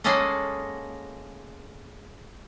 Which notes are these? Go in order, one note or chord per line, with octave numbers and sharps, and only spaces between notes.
G#3 A#3 C#4 A4 D#5 F#5